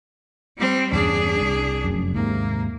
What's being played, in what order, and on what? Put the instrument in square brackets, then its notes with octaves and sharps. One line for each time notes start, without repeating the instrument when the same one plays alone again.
[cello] G3 C4
[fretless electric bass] E2 G2 C#3 [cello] D4 G#4
[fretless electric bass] C2
F1 F#2
[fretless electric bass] D#2 G#2 C3 [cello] A#3